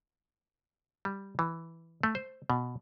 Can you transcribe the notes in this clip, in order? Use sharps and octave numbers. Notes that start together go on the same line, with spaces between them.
G3
E3
A3
C5
B2